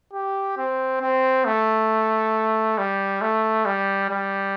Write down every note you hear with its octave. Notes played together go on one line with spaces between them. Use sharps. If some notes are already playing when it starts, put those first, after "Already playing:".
G4
C4
C4
A3
G3
A3
G3
G3